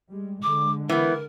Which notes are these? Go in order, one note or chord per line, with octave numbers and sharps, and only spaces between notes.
G3 G#3
D3 G#3 D6
E3 B3 A#4